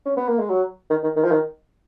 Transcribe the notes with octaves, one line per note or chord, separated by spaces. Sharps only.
C#4
B3
A#3
G#3
F#3
D#3
D#3
D#3
F3
D#3